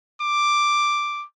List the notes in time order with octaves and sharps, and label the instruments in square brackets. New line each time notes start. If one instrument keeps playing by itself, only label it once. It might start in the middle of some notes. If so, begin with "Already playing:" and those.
[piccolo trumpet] D6